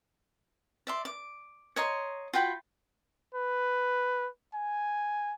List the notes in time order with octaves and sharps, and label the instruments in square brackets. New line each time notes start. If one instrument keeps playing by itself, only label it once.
[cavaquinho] D5 E5 C6
D6
C#5 D#5 A#5 C6
F4 F#4 G5 B5
[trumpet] B4
G#5